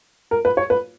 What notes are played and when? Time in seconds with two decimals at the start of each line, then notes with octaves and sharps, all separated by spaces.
0.31 A#4
0.45 B4
0.57 C#5
0.70 B4